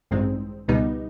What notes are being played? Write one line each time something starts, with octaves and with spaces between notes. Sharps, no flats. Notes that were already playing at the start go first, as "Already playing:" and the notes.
A1 G2 D#3 G#3 C4
C#2 B2 G3 B3 D#4